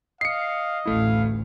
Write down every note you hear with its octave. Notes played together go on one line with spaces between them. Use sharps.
D#5 F5 C7 C#7
A1 D2 A3 E4 F5